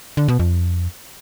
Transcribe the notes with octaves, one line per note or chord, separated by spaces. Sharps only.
D3
B2
F2